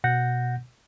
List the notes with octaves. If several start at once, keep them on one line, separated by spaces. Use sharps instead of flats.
B2 F#5 G6 A#6